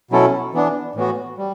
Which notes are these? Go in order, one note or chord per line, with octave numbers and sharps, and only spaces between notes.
B2 F#3 C#4 E4 A4
E3 B3 D4
A2 E3 B3 F#4
G3